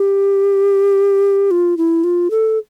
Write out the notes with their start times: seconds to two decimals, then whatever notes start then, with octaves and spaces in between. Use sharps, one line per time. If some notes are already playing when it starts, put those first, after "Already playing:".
Already playing: G4
1.51 F4
1.77 E4
2.04 F4
2.31 A4